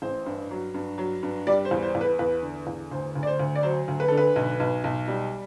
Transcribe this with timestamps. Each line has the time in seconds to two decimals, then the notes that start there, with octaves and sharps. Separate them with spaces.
0.02 A1 C5
0.26 G2
0.51 F#3
0.74 G2
0.98 F#3
1.23 G2
1.47 G3 D5
1.65 C5
1.71 E2
1.83 C5
1.95 E2
2.01 B4
2.19 E2 B4
2.43 D3
2.67 E2
2.91 D2 C5
3.16 D2
3.23 D5
3.27 C5
3.39 D2
3.55 D5
3.63 F#3 C5
3.88 D2
4.00 B4
4.08 D3 A4
4.17 B4
4.36 B1
4.60 B1
4.84 B1
5.08 G3